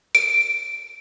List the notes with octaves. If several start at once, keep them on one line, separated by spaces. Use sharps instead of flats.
D7